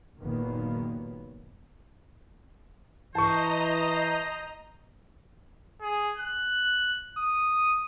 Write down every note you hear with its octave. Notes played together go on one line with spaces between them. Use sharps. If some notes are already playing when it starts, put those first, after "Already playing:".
F#1 A#2 D#3 F#3 A#3 B3
E3 C5 D#5 A5 A#5 C#6
G#4
F#6
D#6